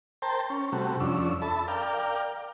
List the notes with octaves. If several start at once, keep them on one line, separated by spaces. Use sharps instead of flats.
A#4 C5 G5 A5
C#4
C3 G3 A3 F#4
F2 C#4 D4 E6
A4 E5 A5 B5
A#4 D5 F5 G5